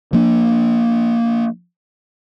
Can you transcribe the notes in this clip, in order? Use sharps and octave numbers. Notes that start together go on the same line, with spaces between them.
F3 A#3 D4